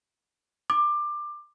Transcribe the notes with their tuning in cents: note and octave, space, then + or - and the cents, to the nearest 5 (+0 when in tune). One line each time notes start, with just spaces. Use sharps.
D6 +20